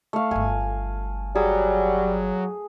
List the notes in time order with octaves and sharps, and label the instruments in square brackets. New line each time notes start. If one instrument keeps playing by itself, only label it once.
[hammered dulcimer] A3 F5
[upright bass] D1 G1 [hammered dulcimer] G#5
[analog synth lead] F#3 [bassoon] G3 [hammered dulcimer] G#4